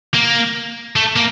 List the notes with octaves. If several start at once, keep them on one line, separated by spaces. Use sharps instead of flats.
A#3
A3
A#3